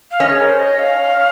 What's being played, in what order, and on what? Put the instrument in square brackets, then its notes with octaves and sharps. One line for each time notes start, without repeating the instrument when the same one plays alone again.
[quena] F5
[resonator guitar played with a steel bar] C#4 [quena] D#5
[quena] G#4
A#4
C5
D#5
F5